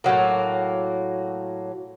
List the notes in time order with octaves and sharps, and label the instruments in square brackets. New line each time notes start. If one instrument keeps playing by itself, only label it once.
[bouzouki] A2 C3 F#3 A#3